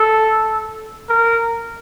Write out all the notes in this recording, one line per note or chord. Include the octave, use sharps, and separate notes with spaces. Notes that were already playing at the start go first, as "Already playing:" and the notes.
Already playing: A4
A#4